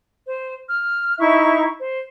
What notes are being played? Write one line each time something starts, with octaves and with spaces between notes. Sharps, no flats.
C5
F6
D#4 E4 E5 C#6
C5